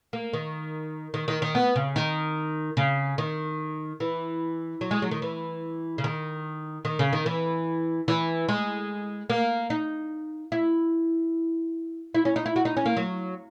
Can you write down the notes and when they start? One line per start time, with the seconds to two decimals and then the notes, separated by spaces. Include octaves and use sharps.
0.13 A#3
0.33 D#3
1.14 D#3
1.28 D#3
1.42 D#3
1.55 B3
1.76 C#3
1.96 D#3
2.77 C#3
3.18 D#3
4.00 E3
4.81 F#3
4.91 G#3
5.02 F#3
5.11 D#3
5.22 E3
5.98 C#3
6.04 D#3
6.85 D#3
6.99 C#3
7.13 D#3
7.26 E3
8.08 E3
8.48 G#3
9.30 A#3
9.70 D#4
10.52 E4
12.15 E4
12.25 C#4
12.36 D#4
12.46 E4
12.56 F#4
12.65 D#4
12.77 C#4
12.86 A#3
12.97 F#3